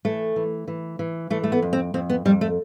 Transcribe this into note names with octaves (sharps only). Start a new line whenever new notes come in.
E3 A3
E3
E3
E3
E3 A3
A3
B3
F2
C4
F2 C4
B3
F2 G3
A3